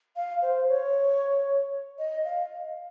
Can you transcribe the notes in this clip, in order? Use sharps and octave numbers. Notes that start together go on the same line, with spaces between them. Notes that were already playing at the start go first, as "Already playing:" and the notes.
F5
C5
C#5
D#5
F5